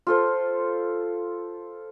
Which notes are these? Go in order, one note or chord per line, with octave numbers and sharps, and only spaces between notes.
F4 A4 C5